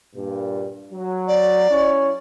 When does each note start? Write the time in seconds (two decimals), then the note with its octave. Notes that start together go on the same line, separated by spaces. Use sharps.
0.15 G2 A#2
0.93 F#3
1.28 D5
1.70 C#4 E4 C#5